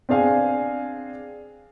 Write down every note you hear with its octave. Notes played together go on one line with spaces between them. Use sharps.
C4 D4 G#4 F5 G#5